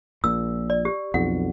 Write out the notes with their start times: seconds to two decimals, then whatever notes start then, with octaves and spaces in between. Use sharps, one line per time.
0.24 A#1 A#2 E6
0.70 D5
0.85 G4
1.14 B1 F2 F#5